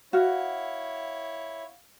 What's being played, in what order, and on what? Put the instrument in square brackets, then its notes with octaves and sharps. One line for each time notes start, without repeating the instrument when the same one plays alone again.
[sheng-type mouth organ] E4 C#5 [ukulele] F#4 [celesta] F5 F#5 F6